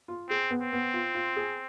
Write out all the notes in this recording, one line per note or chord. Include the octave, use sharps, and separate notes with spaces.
F4
C4 G#4
B3
C4
B3
F4
F4
G#4